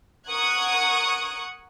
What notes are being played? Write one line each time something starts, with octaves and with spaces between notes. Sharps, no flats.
A#4 F#5 C#6 D#6 F#6 G#6